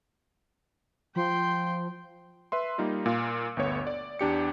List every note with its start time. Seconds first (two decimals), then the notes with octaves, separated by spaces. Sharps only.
1.16 F3 G5 C6
2.52 B4 E5 C6
2.78 G3 A#3 D#4 F4
3.06 A#2 F4 F5
3.57 G1 D2 B3 C#5
3.87 D5
4.19 E2 D4 G4 C#7